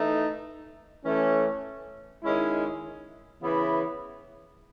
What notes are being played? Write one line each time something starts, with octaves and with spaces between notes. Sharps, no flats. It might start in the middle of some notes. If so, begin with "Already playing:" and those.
Already playing: E3 A3 D#4
E3 A3 C#4
D#3 G#3 C#4 E4
C#3 E3 B3 E4